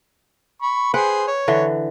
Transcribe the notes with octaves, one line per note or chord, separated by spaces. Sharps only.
B5 C#6
G#4 B4 C5 F#5 G5
C#5
D3 E3